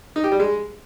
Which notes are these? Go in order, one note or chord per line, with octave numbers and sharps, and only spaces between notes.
D#4
G4
G3
G#3